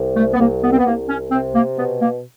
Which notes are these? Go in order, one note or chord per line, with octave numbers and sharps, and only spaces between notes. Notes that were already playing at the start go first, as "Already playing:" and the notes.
Already playing: C2
A3
B3
C2 A#3
B3
C4
B3
C2 A#3
C#4
C3 C4
A#3
B2 B3
A#3